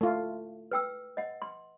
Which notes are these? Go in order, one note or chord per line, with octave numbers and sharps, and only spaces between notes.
A3 F4
B4 G5 E6
D#5 F#5
C6